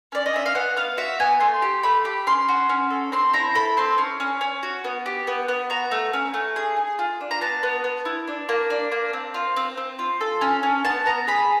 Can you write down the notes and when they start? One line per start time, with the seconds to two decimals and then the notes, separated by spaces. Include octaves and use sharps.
0.12 C#4 D5
0.26 D#5
0.33 C#4 E5
0.46 F5
0.55 B3 F#5
0.76 B3 F5
0.97 F#4 E5
1.20 B3 G#5
1.40 A3 C6
1.62 G4
1.83 A3 B5
2.05 G4
2.27 C#4 C6
2.49 F#4
2.69 C#4
2.90 A4
3.12 C4 C6
3.33 E4 A#5
3.55 A4 B5
3.77 C4 C6
3.98 C#4
4.20 C#4
4.41 C#4
4.63 F#4
4.84 B3
5.06 G4
5.27 B3
5.48 B3
5.70 F#4 A#5
5.91 A3
6.13 C#4
6.34 A3
6.56 G#4
6.77 G#4
6.99 F4
7.21 D4
7.31 A#5
7.41 B3 A5
7.63 B3
7.84 B3
8.05 E4
8.28 D4
8.49 A#3
8.70 D4
8.92 A#3
9.13 C4
9.34 F4
9.56 C4
9.77 C4
9.99 F4
10.21 A4
10.41 C#4
10.63 C#4
10.85 B3 A5
11.06 B3 A#5
11.27 G#4 B5